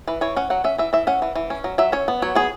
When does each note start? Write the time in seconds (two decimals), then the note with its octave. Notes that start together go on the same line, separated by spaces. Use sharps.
0.08 E3 B4
0.21 E3 C#5
0.36 C#4 F#5
0.50 F#3 F#5
0.64 C#4 E5
0.78 E3 E5
0.93 E3 E5
1.07 C#4 F#5
1.22 E3
1.35 E3
1.50 C#4
1.64 F#3
1.78 F#3 E5
1.92 C#4 C#5
2.08 B3
2.22 F#3 C#5
2.35 B3 G#4